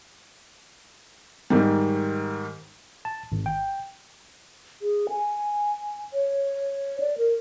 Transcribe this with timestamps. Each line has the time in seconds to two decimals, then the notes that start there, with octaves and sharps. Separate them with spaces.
1.50 G#2 D#3 G3
3.05 A5
3.32 G#1
3.46 G5
4.82 G#4
5.10 G#5
6.13 C#5
7.00 D5
7.18 A#4